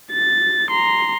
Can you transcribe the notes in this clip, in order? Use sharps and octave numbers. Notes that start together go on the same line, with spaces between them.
A6
A#5 C6